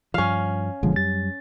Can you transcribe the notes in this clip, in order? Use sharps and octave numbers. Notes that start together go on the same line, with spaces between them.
G2 F3 C#4 F5
F#1 B2 D3 F3 G#3
F#2 G3 A6